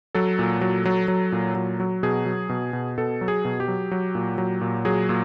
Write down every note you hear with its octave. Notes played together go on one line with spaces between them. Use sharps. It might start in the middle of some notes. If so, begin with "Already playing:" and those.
F#3 A4
A#2
F#3
F#3
F#3
A#2
F#3
F#3
B2 G#4
F#3
B2
B2
B2 A4
F#3
G#4
B2
G4
F#3
F#3
A#2
F#3
A#2
F#3 G#4
A#2